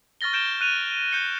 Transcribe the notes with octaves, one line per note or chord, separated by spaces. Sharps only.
C#6 F6 A6 A#6 G7
F6 G6 D7 E7 G7
F#6 D#7 F7
G6 C#7 G7